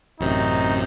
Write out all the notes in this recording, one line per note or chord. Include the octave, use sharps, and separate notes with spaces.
A1 F#2 C3 D#4